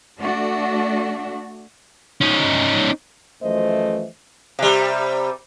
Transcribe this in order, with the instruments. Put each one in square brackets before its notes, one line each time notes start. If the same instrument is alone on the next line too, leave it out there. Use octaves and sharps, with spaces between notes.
[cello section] A3 D4 F#4 D5
[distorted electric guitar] C#4 D#4
[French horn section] F#2 E3 F3 A3 C5 D#5
[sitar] C3 G3